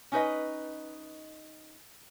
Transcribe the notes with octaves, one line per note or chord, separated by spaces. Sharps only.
C#4 D#4 B4 D#5